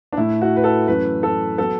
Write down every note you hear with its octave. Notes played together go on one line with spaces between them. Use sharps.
D4
A2 A3 E4
F#4
B4
A4
F#2 E3 A3 B4
A4
F#3 B3 A4